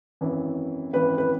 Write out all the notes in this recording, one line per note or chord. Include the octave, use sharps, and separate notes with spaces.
G#1 F#2 E3
G#1 F#2 E3 B4
B4